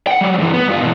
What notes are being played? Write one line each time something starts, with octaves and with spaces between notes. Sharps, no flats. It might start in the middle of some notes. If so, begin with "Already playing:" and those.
F#5 G5
F#3 G3
G2 E3
B3
G2 F4
B2 E3